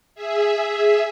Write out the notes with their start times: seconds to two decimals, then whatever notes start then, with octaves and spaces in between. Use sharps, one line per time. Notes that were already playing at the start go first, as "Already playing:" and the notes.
0.15 G#4 E5